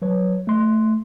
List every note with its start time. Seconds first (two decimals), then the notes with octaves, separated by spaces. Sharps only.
0.02 F#3 B4 C#5
0.47 A3 C6